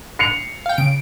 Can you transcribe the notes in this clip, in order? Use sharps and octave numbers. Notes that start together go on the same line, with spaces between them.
C7 C#7 F7
F5 G5
C#3 D7